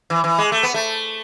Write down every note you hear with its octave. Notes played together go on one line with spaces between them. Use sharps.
E3
E3
G#3
A3
B3
A3